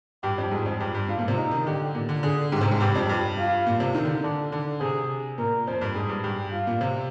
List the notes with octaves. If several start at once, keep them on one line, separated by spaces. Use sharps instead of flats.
G2 G4
F2
G#2 G#4
F2
G2 G4
G2
G#2 F4
A#2
C3
D#4
D#3
D3 G4
A#2
D3
D3 G#4
G#2 G4
C3
G#2
G2 G4
F2
G2 G4
F4
A#2
C3
D#3
D3
D#3
D3 D4
D3
C3 G#4
A#2 A#4
F2 C5
G2
G#2 G#4
G2
G2 G4
F4
A#2
C3